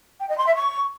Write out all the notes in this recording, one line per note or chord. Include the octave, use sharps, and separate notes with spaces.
G5
D#5
C6
E5
C#6